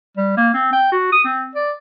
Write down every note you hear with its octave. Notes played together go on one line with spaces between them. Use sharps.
G3
A#3
C4
G5
F#4
D#6
C4
D5